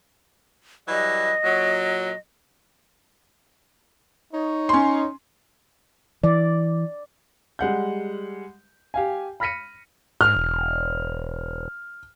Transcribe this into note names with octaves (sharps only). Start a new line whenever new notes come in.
E3 F#3 G3 D#5
A#2 F#3
D#4 C#5
C#4 C6
E3 D5
G3 G#3 F#5 G6
G4 F5 G#5
B5 F6 A#6 B6 C#7 D#7
G#2 F6
E1